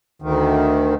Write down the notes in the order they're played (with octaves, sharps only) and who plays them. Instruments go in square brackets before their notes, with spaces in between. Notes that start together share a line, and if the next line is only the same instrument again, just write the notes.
[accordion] D2 D#3